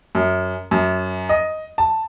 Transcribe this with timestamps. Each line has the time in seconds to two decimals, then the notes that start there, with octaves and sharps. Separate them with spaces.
0.15 F#2
0.71 F#2
1.29 D#5
1.78 A5